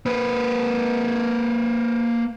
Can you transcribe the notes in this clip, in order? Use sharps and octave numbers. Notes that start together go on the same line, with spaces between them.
A#3 B4